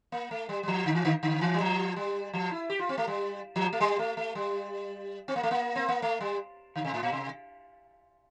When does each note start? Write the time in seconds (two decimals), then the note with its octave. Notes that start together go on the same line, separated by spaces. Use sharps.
0.12 A#3
0.31 A3
0.49 G3
0.63 G3
0.68 F3
0.86 D3
0.95 E3
1.05 D3
1.23 D3
1.41 E3
1.54 G3
1.60 F3
1.96 G3
2.33 F3
2.51 E4
2.70 G4
2.79 F4
2.89 C4
2.98 A3
3.08 G3
3.56 F3
3.73 A3
3.80 G3
3.99 A3
4.17 A3
4.35 G3
5.28 C4
5.36 A#3
5.43 A3
5.51 A#3
5.76 C4
5.89 A#3
6.02 A3
6.21 G3
6.76 D3
6.85 C3
6.94 A2
7.03 A#2
7.12 C3